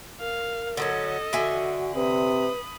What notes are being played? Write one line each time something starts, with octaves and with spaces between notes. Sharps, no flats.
A#4 F5
D3 F#3 C#4 A4 D#5
D3 F#4 E5 G#5
C3 B4 B5 D#6